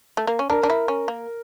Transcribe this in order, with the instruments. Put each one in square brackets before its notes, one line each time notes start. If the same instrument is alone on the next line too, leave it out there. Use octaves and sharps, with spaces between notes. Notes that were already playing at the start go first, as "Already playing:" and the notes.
[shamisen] A3
A#3
C#4
[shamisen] D4 [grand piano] A#4
[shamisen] D4
E4
C#4
A#3